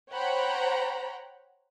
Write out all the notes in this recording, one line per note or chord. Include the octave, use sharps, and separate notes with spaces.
C5 C#5 F#5 G5 A#5 B5